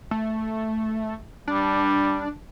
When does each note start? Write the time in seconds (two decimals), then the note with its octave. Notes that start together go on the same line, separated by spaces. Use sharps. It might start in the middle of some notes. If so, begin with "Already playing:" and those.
0.11 A3
1.48 G3 D4